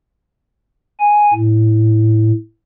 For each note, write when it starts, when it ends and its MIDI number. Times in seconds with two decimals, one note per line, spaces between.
1.00 1.33 80
1.33 2.32 45